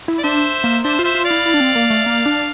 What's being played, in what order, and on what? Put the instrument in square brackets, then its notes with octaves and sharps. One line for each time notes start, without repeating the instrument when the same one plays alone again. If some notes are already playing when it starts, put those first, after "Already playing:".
[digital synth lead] E4
[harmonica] D5
[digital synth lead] D4 [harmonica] C5 E5
[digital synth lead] A#3
[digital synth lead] D4 [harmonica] C5 E5
[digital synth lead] F4
[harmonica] C5 E5
[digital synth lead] F4
[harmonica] D5 F5
[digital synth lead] E4
E4
D4
C4
A#3
A3
A#3
D4